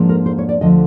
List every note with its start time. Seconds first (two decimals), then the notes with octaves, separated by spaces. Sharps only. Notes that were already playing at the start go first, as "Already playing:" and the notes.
Already playing: G#2 F3 A#3 D4
0.09 A#4
0.26 C5
0.38 C#5
0.49 D5
0.61 D2 D3 F3 D#5